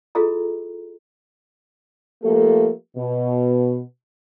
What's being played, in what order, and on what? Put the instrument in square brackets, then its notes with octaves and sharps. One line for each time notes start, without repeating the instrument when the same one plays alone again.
[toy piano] E4 F4 G#4 A4 D#5 A#5
[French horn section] F3 A3 A#3 G4 A4
B2